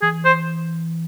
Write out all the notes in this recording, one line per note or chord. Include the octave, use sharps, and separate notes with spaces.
E3 G#4
C5